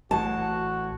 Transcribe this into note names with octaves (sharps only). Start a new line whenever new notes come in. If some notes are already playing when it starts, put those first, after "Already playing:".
A1 A2 F#4 A5